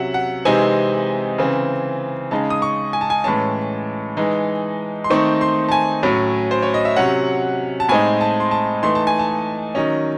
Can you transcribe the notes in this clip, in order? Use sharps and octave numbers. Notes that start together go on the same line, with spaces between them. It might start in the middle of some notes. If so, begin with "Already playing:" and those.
Already playing: C3 F#3 C#4 E5 F#5
F#5
C3 E3 G#3 C4 D#4 G#5
C#3 E3 C4
C#3 G#3 D#4 A5
D#6
C#6
G#5
A5
G#5
A2 E3 G#3 C#4 A5
E3 G#3 D#4
C6
D#3 A3 C4 D#4 C#6
C6
A5
G#5
A2 F#3 C#4
C5
C#5
D#5
E5
C3 F#3 C#4 F#5
A5
A2 G#3 C4 D#4 G#5
A5
C6
A5
E3 A3 D#4 C6
A5
G#5
A5
D#3 F#3 C#4 D#5